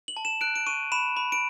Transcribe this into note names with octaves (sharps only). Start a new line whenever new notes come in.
F#7
A5
E7
F#6 D7
D7
C#6 D#7
B5 E7
B5
D7